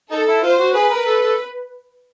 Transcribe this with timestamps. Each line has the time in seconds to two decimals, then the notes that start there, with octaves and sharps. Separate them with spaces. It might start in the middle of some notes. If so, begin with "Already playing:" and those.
0.11 D#4 A4
0.28 E4
0.43 F4 C5
0.59 F#4
0.75 G#4 B4
0.91 A#4
1.06 A4
1.22 A4